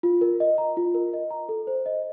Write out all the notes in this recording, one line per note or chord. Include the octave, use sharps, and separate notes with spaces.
F4
A#4
D#5
A#5
F4
A#4
D#5
A#5
A4
C5
D#5